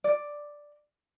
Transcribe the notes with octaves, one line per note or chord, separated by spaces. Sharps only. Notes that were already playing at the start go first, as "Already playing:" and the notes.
D5